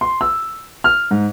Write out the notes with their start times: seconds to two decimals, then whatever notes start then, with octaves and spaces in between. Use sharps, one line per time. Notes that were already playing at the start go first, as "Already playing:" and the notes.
0.01 C6
0.21 E6
0.84 F6
1.11 G#2